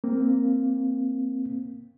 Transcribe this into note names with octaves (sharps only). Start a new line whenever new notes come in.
A#3 C4